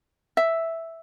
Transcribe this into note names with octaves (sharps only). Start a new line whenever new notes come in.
E5